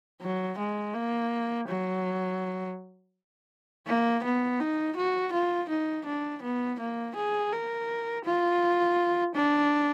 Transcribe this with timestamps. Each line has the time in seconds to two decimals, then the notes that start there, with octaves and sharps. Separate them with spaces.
0.22 F#3
0.59 G#3
0.95 A#3
1.68 F#3
3.87 A#3
4.24 B3
4.60 D#4
4.97 F#4
5.33 F4
5.70 D#4
6.06 D4
6.43 B3
6.80 A#3
7.16 G#4
7.53 A#4
8.25 F4
9.35 D4